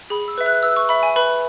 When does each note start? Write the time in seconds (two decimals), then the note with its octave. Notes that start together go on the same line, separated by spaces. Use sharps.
0.10 G#4 B5
0.28 E6
0.38 B4 E5
0.46 F#6
0.63 B4 E6
0.76 C#6
0.89 E5 B5
1.03 G#5
1.16 B4 B5